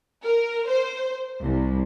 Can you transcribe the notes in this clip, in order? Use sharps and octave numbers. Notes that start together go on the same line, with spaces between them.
A#4
C5
C2